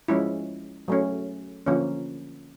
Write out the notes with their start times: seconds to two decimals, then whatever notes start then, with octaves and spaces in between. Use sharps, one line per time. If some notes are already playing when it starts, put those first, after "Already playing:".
0.08 F3 G#3 C#4 E4
0.88 F#3 A3 C#4
1.66 D3 F3 A#3 C#4